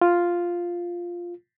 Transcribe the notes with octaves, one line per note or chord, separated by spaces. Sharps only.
F4